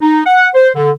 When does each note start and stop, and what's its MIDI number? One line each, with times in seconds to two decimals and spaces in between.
0.01 0.21 63
0.26 0.48 78
0.54 0.69 72
0.75 0.90 50